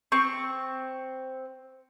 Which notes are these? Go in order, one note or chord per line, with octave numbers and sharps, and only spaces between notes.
C4 C#6